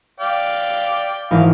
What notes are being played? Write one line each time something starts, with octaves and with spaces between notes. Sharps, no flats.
D5 F5 G5
G#1 E3 F5